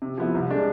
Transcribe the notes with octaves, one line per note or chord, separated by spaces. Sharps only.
C3
F3 B3 E4
C2
C3 G#3 D4